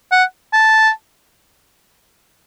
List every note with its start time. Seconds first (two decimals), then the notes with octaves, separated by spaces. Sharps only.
0.12 F#5
0.53 A5